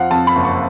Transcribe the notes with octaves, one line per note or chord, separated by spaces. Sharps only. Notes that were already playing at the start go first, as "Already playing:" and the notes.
Already playing: F2 F3 F5 F#5
F2 A5
B5
F#1
C#6